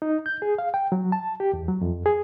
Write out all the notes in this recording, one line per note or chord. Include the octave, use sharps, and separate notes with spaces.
D#4
G6
G#4
F5
G5
F#3
A5
G4
E2
F#3
F2
G#4